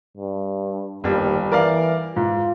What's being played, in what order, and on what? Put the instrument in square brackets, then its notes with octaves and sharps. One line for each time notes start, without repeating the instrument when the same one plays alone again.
[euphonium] G2
[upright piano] G1 G3 [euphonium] D#2
[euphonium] E3 [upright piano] A#4 D5 F5
[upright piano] G#2 [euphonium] F4